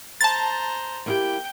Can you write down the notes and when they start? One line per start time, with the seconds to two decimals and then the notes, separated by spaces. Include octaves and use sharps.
0.21 C5 A5 A#5 A6
1.06 A#3 E4 G4 G5